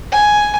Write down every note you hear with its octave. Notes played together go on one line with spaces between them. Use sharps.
G#5